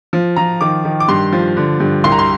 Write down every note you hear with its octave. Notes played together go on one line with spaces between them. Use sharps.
F3
F3 A#5
D#3 D6
D#3
D6
G2 C6
F3
D3
G2
C2 C6
A#5
C6